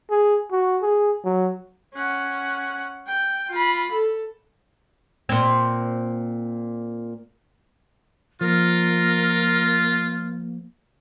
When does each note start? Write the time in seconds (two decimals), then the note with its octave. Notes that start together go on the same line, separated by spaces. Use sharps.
0.10 G#4
0.52 F#4
0.82 G#4
1.24 F#3
1.95 C#4 F#5
3.07 G5
3.51 F4 B5
3.92 A4
5.29 A#2 C4
8.41 F3 A#3 F4 A#4